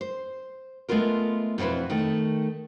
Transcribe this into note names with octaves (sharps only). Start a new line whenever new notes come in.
C5
G#3 A3 B3 F4 A#4
F2 B2 C4 E4 B4
D#3 A3